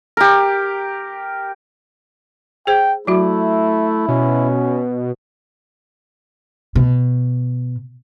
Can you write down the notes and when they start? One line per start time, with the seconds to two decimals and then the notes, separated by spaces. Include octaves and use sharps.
0.17 G4 A#4
2.67 G#4 C5 G5
3.07 F#3 A3 E4 F#4
4.09 B2 C#4
6.75 B2